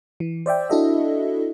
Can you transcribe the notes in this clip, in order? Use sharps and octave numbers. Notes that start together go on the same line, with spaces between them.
E3
C5 D5 E5 G5
D4 E4 F#4 A4 D#5 E5